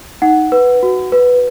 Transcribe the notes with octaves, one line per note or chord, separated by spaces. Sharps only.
D#4 F#5
B4
F#4
B4